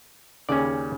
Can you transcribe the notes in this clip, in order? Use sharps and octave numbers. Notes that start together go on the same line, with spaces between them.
D#2 C#3 C#4 D5